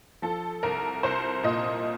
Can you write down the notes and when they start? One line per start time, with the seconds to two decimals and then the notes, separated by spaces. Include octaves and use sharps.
0.22 F3 A4
0.63 C2 A#4
1.03 C2 C5
1.43 A#2 D#5